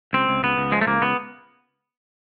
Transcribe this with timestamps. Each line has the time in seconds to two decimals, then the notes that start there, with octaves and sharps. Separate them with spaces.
0.13 C#2 C4
0.28 C#2
0.43 C#2 B3
0.58 C#2
0.72 F3 G#3
0.81 A3
0.87 C#2 A#3
1.02 C#2 B3